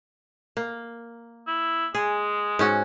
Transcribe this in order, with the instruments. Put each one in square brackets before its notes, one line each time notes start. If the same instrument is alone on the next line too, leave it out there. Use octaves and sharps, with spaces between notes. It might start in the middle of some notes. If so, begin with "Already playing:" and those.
[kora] A#3
[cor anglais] E4
[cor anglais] G#3 [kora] G#4
[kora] G#2 C#4 F#4